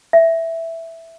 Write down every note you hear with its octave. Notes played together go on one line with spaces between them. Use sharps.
E5